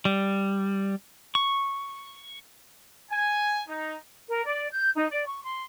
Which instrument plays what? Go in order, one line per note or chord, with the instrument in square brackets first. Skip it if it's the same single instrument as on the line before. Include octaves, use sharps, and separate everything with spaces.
[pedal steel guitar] G3
C#6
[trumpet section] G#5
D#4
[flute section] A#4
D5
G6
D#4
D5
C#6
C6